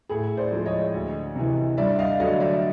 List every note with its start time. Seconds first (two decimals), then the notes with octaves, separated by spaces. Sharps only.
0.09 A2 G#4
0.37 C5 D5
0.51 F3 G#3
0.66 C#5 D#5
0.94 D2
1.35 C3 E3
1.77 G2 D5 E5
1.99 D#5 F5
2.20 D3 F#3 A3 D#5 F5
2.40 D5 E5